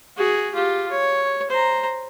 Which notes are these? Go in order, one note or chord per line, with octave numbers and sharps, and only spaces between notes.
F#4 G#4
F4 G4
C#5
C5 A#5